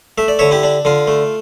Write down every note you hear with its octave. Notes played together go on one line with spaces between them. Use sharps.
A3 E5
D5
D3 C#5 E5
E4 G4
D4
D3 F4
A3